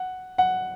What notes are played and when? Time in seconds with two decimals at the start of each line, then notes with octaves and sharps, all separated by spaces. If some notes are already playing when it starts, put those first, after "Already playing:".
Already playing: F#5
0.38 F#5